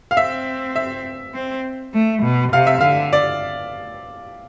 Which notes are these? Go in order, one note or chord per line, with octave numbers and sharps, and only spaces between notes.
F5
C4 E5
E5
C4
A3
B2
C3 F5
E5
D3 F5
D5